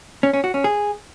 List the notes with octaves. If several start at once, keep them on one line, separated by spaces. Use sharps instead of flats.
C#4
C#4
F#4
C#4
G#4